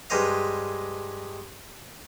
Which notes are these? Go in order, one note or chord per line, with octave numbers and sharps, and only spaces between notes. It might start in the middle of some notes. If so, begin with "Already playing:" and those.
G2 G#3 C5 D#5 F5